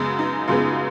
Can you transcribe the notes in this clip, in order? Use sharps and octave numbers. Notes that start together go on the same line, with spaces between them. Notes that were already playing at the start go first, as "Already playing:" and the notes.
Already playing: F#2 C#3 G#3 B3
D#4
F#2 C#3 G#3 B3 F4